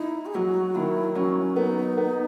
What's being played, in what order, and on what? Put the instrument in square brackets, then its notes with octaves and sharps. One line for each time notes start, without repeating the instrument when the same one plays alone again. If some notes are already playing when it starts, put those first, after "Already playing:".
Already playing: [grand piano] D#4 [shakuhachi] E4
[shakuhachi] G#4
[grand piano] F#3 [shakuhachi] F#4
[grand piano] D#3 [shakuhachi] E4
[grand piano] F#3 [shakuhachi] C#4
[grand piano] B3 [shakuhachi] D#4
[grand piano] B3